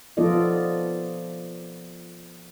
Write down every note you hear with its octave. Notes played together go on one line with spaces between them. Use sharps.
F3 B3 F4 A4 D5 D#5